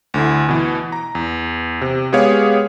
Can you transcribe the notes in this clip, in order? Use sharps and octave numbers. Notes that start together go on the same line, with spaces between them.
D2 D3 E4
B2 E3
A#5
E2
C3
G#3 B3 G4 G#4 C#5 F5